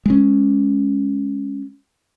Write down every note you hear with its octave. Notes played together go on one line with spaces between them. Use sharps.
G#3 C#4